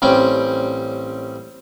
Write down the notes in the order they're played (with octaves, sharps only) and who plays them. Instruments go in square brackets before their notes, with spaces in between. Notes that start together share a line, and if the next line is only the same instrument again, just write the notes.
[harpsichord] A1 G3 C4 C#4 G5 D6